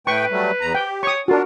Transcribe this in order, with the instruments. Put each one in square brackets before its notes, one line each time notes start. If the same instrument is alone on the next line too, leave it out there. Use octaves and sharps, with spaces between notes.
[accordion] A2 A3 G5 [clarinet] B4 [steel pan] C#6
[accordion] F#3 G3 A3
E2 A#5
[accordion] G4 [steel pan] G5
[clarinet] C#5 [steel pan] C#6 D#6
[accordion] D4 [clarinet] F4 [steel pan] F#4 A#4